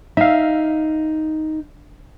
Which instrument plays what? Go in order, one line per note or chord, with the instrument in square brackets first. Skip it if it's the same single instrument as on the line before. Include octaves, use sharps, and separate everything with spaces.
[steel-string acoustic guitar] D#4 [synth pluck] E5 F5